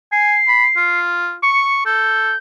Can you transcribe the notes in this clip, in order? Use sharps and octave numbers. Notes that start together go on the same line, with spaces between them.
G#5 C7
B5
F4
C#6 C#7
A4 G6